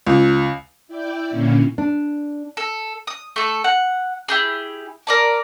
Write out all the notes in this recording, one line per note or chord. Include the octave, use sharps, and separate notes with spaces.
C#2
E4 D5 G5
A#2 D3 A#3 C#4 E4
D4
A4
D#6
A3 A4
F#5
E4 G4 G#4
A#4 D5 A5